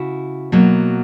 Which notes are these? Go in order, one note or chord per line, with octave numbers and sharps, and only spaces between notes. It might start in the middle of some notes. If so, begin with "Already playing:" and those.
Already playing: C#3 E4 F#4
B2 F#3 A#3